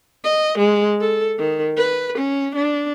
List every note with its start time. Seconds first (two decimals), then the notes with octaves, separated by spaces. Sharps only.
0.25 D#5
0.58 G#3
1.01 A4
1.39 D#3
1.77 B4
2.18 C#4
2.55 D4